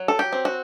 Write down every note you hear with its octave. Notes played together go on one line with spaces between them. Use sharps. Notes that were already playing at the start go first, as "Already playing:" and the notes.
Already playing: F#3
A4
G4
C4
F#4